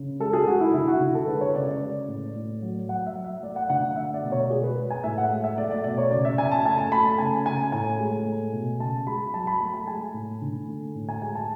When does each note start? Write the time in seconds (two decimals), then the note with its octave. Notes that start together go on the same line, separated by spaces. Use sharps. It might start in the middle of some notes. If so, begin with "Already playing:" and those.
Already playing: C#3
0.20 G#3 A4
0.33 G#4
0.47 G#3 F#4
0.61 E4
0.74 D3 E4
0.87 F#4
1.00 D3
1.15 A4
1.28 G#3 B4
1.41 C#5
1.55 C#3 D5
1.68 D5
1.81 G#3
2.08 A2
2.35 A2
2.62 F#3
2.89 F#3 F#5
3.06 E5
3.16 F#3
3.25 E5
3.43 A3 D5
3.56 F#5
3.69 D3 F#5
3.83 F#5
3.96 A3 E5
4.14 D5
4.23 B2
4.32 C#5
4.50 G#3 G#4
4.63 B4
4.77 G#3
4.91 G#5
5.04 A2 E5
5.18 F#5
5.31 G#3
5.44 E5
5.58 A3 D5
5.71 D5
5.84 B2 D5
5.98 C#5
6.11 C#3 D5
6.25 E5
6.38 C#3 G#5
6.51 A5
6.65 A3 G#5
6.78 A5
6.92 A3 B5
7.05 A5
7.18 C#3 G#5
7.46 C#3 G#5
7.72 A2 G#5
8.00 G#3
8.26 A3
8.53 B2
8.80 C#3 A5
9.07 G#3 B5
9.34 F#3 A5
9.47 B5
9.61 A3 B5
9.74 A5
9.87 G#3 G#5
10.14 A2
10.42 D3
10.68 A3
10.95 A2
11.09 G#5
11.22 G#3 G#5
11.35 A5